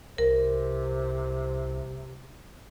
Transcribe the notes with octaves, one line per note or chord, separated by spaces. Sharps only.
C2 C3 A#4 C5